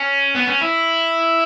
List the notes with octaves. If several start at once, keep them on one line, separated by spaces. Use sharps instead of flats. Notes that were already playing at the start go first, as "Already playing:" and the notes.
Already playing: C#4
B3
C#4
E4